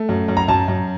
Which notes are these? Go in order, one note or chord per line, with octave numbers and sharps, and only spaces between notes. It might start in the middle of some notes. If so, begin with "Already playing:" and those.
Already playing: A3
F#2
F#2
A#5
F#2 A5
F#2